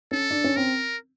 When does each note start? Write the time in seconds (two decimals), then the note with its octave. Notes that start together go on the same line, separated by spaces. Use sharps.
0.11 C#4 A4
0.31 D4
0.44 C#4
0.56 C4 A#4